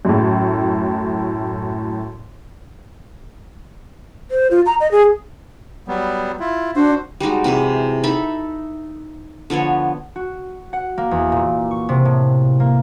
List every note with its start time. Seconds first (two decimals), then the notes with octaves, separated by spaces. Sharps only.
0.05 F#2 A2
4.31 C5
4.51 F4
4.66 A#5
4.80 D#5
4.91 G#4
5.88 F#3 G3 B3
6.40 E4 F4
6.76 D4 F#4 C5
7.20 G3 G#3 D#4 F#4
7.44 C3 E3 G#3 G#4
8.03 D#4 A4 E5 B5
9.50 D3 F3 B3 C#5
10.16 F#4
10.73 F#5
10.98 A#3
11.11 E2
11.32 A#2
11.71 C#6
11.89 C3
12.05 A2
12.60 A#3